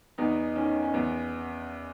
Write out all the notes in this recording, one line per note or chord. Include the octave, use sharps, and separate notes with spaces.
E2 B3 D#4
D#3 C#4
C#4
E2 B3